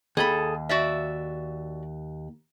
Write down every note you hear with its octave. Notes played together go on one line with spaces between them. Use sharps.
D#2 G#4 A4 B5
F#4 D5 E5